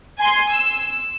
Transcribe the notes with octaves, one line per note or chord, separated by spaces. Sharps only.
G#5 C6
E6